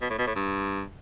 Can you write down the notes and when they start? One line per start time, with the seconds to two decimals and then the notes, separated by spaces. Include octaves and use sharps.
0.02 B2
0.10 A2
0.18 B2
0.27 A2
0.35 G2